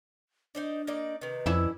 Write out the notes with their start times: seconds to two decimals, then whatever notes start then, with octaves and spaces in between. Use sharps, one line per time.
0.55 D4 D#4 C5 D5
0.87 A#3 D#4 D5
1.21 C3 D#3 B4
1.46 F2 C#4 D4 E4